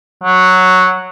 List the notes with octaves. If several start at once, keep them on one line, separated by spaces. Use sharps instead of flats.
F#3